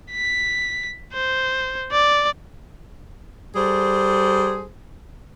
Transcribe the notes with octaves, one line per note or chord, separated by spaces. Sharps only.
B6
C5
D5
G3 G#4 A4 C5